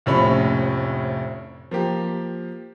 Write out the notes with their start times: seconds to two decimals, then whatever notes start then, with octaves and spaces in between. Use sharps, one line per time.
0.06 F1 A#1 A2 F3 C#4 B5
1.71 F3 A#3 G4